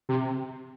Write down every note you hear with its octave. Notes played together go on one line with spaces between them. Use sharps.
C3